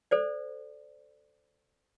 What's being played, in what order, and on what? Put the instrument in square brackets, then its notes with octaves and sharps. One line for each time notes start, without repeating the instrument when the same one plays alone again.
[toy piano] A4 C5 D5